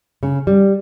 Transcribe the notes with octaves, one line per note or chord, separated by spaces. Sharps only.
C#3
G3